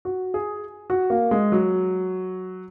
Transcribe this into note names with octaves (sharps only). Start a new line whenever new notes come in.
F#4
G#4
F#4
A#3
G#3
F#3